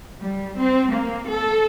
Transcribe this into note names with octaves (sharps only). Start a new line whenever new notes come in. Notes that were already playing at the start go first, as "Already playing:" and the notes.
G3
C4
A#3
A4